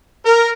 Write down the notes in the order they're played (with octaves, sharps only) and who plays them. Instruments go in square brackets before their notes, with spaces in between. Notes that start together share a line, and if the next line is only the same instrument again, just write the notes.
[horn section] A#4